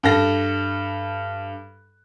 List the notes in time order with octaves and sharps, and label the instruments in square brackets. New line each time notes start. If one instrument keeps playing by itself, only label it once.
[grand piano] G2 A4 A#6